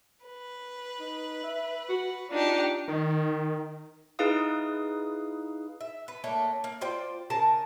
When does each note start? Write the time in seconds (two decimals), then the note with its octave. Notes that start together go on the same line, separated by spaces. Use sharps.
0.24 B4
1.00 D#4
1.43 E5
1.89 F#4
2.30 D4 D#4 F4 G4
2.88 D#3
4.19 D#4 E4 G#4 B4 F5 D#6
5.81 E5
6.08 B4
6.24 A3 A#3 D4 C#5
6.64 A#3
6.81 F4 C5 D5 G5
7.30 C#3 G#4 A#4 A5